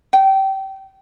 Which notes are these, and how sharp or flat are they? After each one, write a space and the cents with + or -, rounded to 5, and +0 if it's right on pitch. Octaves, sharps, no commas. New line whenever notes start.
G5 -25